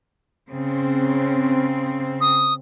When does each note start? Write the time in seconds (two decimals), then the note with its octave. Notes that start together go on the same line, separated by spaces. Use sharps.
0.52 C#3 C4
2.21 D#6